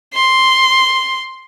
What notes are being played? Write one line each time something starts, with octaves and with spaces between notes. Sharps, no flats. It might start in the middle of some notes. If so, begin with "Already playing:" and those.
C6